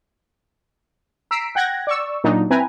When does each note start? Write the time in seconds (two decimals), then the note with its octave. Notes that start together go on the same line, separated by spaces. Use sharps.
1.31 A#5 E6 B6 C7 D7
1.55 F#5 G5 F#6 G#6 A#6
1.87 D5 C#6 E6
2.24 A#2 F#3 D4 D#4
2.50 C4 E4 B4 G5 G#5 A#5